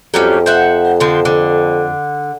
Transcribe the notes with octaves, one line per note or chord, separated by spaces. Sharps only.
F2 F#3 G3 C#4
C5 E5 F#5
D3 F3 C4
D3